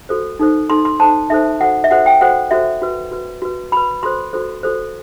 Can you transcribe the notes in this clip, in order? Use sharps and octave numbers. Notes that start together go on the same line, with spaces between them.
F#4 A4 C5
D#4 A4 C5
D#4 A4 C5 C6
C6
D#4 A4 C5 A5
D#4 A4 C5 E5
F#4 A4 C5 F#5
E5
F#4 A4 C5 F#5
G5
F#4 A4 C5 F#5
F#4 A4 C5 E5
F#4 B4
F#4 B4
F#4 B4
F#4 B4 B5
F#4 A4 C5 C6
F#4 A4 C5
F#4 A4 C5